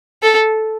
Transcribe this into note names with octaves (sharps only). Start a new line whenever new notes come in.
A4